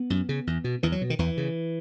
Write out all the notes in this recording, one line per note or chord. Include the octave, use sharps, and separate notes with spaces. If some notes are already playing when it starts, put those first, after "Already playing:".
Already playing: B3
F#2
C#3
E2
B2
E2 E3
F#3
B2
D#3
E2 E3
C#3